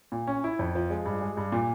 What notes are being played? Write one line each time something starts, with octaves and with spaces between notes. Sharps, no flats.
A#2
C#4
E4
F2
F3
G#3
G2
G#3
G2
A#2